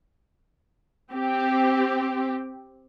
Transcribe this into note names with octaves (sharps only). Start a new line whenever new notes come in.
C4 G4